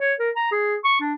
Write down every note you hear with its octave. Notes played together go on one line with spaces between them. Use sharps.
C#5
A#4
A#5
G#4
C#6
D4